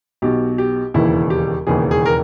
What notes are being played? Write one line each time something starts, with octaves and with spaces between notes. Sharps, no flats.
B1 B2 G4
G4
E1 D#2 C#3 E3 E4
G4
E1 D#2 C#3 E3 G#4
G#4
A#4